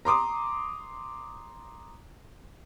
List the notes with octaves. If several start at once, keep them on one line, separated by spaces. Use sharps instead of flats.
A#5 C6 D6 D#6